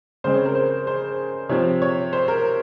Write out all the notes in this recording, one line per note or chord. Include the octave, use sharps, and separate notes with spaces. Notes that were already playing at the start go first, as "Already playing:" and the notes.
C#3 G#3 C4 C5
C#5
A#4
C5
C5
C3 F3 C4 C#5
C#5
C5
A#4